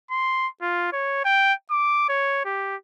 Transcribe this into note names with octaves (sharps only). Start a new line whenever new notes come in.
C6
F4
C#5
G5
D6
C#5
G4